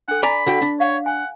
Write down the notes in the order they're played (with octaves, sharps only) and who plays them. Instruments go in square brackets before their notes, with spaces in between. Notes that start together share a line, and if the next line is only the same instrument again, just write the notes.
[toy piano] D4 A4 [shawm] F#5
[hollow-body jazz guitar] D5 G#5 A#5 [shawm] B5
[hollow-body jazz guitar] D3 F#4 G5
D4
[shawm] C#5 [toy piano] F5 F#5
[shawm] F#5 [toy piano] G#5